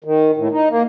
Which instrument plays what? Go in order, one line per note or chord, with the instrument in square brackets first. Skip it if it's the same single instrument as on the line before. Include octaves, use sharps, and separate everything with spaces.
[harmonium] D#3
A2
D#4
A#3